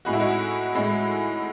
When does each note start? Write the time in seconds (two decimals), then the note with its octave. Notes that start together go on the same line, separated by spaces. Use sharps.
0.05 A2 G#3 F#4
0.13 E4
0.19 D#4 F#4
0.75 A2 G#3